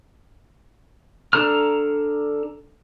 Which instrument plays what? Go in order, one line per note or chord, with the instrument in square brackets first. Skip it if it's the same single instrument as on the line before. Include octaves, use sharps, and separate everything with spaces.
[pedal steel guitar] D4 A4 A#5 F6